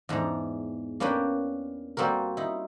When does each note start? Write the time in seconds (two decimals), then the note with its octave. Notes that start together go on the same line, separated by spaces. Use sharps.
0.09 E2 G#2 D4 A#5
1.00 A#3 C#4 D4 B4 G5
1.97 G3 A#3 C4 F#4 A#4
2.37 D#4 E4